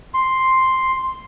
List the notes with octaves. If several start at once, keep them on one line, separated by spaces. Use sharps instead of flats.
C6